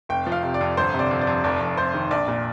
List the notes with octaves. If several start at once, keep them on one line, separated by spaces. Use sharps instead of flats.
F1 G5
F3
F5
C3
D5
F2
G1 C5
C3
D5
F2
D5
F2
F1 D5
F1
F1 C5
D#3
A#1 D5
A#2